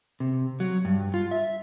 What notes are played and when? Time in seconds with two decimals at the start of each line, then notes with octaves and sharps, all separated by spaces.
0.20 C3
0.60 F#3
0.85 G2
1.14 F4
1.31 E5